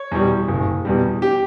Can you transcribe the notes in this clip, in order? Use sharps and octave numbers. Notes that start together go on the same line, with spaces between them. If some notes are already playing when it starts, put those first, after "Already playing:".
Already playing: C#5
E2 B2 G3
F#1
E2 B2 G3
G4